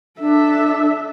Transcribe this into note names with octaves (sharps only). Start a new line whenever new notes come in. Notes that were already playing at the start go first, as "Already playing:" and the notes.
D4 A4 E5